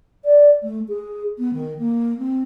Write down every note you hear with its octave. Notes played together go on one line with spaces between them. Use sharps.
D5
A3
G#4
B3
D#3
A#3
C4